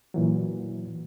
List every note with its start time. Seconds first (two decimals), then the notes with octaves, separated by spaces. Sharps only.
0.14 A#2 E3 F#3